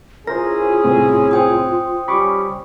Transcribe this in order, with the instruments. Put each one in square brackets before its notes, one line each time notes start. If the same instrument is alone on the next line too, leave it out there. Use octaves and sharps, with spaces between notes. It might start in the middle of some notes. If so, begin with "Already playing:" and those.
[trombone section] C#4 E4 G#4 [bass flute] F4 [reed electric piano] A#4 C5 [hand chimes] A#6
[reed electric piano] C2 A2 C4
[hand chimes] C5 G5 D#6
[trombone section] G3 C#4 [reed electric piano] B5 C#6 D6